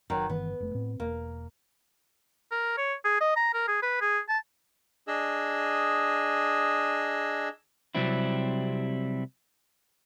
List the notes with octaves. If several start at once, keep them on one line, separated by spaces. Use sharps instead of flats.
F#1 F#2 D#3 F#3
G1 D#3 E3 B3
F1 A3
A2 C4
E1 A#3
A#4
C#5
G#4
D#5
A#5
A#4
G#4
B4
G#4
A5
D4 G#4 D#5 E6
C3 F#3 G3 C4 E4